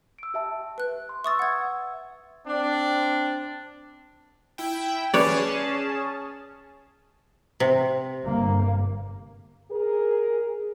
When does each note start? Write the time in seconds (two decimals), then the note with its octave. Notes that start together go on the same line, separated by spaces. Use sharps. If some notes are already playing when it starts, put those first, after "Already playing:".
0.19 E6 D7
0.34 G4 E5 A5
0.78 B4 F#6
1.09 C6
1.24 E5 C#6 D#6 E6 A6
1.39 F#5 G#6
2.47 C4 D4
4.58 E4 G5
5.14 C#4 G#4 B4 C#5 D5 A5
7.60 C3
8.24 G1 A#3
9.72 G#4 A#4